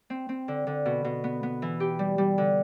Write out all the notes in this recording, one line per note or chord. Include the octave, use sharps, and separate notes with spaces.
C4
C4
D3
D3
B2
B2
B3
B3
E3
G4
G3
G3
D3